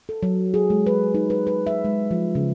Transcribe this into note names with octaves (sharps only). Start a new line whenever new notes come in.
A4
F#3
G#4
G#3
B4
D#4
B4
B4
E5
G#3
F3
C#3